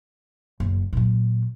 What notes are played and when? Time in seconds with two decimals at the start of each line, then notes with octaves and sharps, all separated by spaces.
0.60 F#1
0.93 A#2 F#3